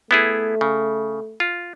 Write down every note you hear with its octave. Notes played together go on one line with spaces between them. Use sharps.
A3 B3 E4 G#4
C#3
F4